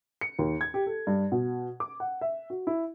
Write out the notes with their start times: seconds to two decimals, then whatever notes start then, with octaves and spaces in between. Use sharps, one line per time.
0.21 C#7
0.39 D#2
0.61 G#6
0.74 G4
0.87 A4
1.07 G2
1.32 B2
1.80 D6
2.00 F#5
2.21 E5
2.50 F#4
2.67 E4